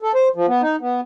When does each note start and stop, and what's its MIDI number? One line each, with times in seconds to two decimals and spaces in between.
0.02 0.12 69
0.14 0.28 72
0.36 0.46 53
0.48 0.62 59
0.62 0.76 63
0.81 1.01 59